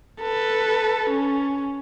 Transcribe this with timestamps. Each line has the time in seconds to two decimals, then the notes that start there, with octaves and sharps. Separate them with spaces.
0.22 A4 B4
1.10 C#4